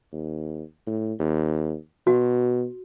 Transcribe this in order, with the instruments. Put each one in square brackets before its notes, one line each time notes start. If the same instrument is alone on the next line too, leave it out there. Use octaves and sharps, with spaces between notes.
[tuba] D#2
A2
D#2
[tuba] B2 [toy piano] F#4